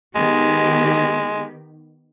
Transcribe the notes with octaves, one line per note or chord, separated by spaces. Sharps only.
D#3 G#3 B3 G4